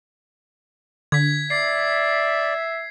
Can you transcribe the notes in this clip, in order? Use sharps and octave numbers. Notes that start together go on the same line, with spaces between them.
D3 G#6 B6
D5 E5 C7